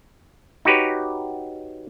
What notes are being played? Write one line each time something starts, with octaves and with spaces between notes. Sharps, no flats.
D#4 F#4 G4 B4 C#5